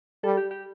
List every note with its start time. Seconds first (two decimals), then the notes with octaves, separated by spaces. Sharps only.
0.24 G3 A4
0.37 G4
0.51 G4